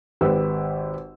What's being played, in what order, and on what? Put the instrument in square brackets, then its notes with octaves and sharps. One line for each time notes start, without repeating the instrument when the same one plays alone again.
[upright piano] G#1 G4 B4 E6